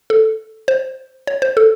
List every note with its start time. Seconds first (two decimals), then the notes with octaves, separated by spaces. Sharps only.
0.10 A4
0.68 C5
1.27 C#5
1.42 C5
1.57 A4